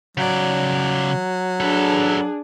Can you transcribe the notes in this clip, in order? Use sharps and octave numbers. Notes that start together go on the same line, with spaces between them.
C#3 F#3 D5
D4 G#4 A4 B4